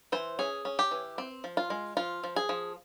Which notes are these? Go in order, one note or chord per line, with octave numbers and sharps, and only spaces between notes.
E3 C5
C#4 G#4
C#4
G4
E3
C4
F3
F4
G#3
F3 F4
F3
G#4
F3